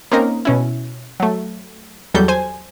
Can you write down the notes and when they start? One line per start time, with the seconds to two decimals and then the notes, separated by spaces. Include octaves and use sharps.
0.12 A#3 C4 C#4 D#4 A#4
0.45 B2 C#4 E4
1.20 F#3 A3
2.14 E2 F#3 G3 A4 G6
2.28 C5 G#5